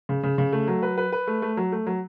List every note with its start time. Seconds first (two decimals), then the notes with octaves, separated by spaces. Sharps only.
0.09 C#3
0.23 C#3
0.38 C#3
0.52 A3
0.68 F#3
0.83 B4
0.98 B4
1.12 B4
1.27 A3
1.42 A3
1.57 F#3
1.72 A3
1.87 F#3